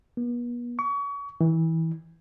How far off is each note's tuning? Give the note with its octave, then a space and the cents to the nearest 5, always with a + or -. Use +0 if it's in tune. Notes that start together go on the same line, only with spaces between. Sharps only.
B3 -40
C#6 +35
E3 -25